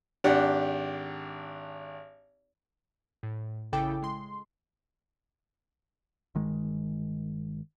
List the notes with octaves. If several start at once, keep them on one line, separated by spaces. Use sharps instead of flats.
G#1 D4 G4 F#5
A2
A1 C#3 E4 A4 G5 D6
G#3 C6
G1 D#3 G#3